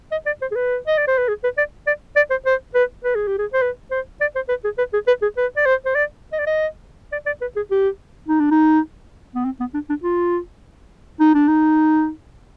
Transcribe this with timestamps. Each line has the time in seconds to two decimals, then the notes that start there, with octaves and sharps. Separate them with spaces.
0.12 D#5
0.26 D5
0.42 C5
0.52 G#4
0.56 B4
0.87 D#5
0.98 D5
1.07 C5
1.18 B4
1.28 G#4
1.44 B4
1.58 D5
1.87 D5
2.16 D5
2.31 C5
2.46 C5
2.75 B4
3.04 B4
3.15 G#4
3.28 G4
3.39 G#4
3.53 C5
3.62 B4
3.91 C5
4.21 D5
4.36 C5
4.49 B4
4.64 G#4
4.78 B4
4.93 G#4
5.07 B4
5.22 G#4
5.37 B4
5.57 D5
5.66 C5
5.85 C5
5.95 D5
6.32 D#5
6.39 D5
6.47 D#5
7.12 D5
7.26 D5
7.42 B4
7.56 G#4
7.71 G4
8.28 D#4
8.40 D4
8.51 D#4
9.35 B3
9.45 C4
9.60 B3
9.74 D4
9.89 D4
10.03 F4
11.20 D#4
11.35 D4
11.48 D#4